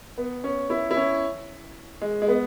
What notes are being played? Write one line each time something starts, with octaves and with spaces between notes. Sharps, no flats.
B3
C#4
E4
E4
C#4
G#3
G#3
B3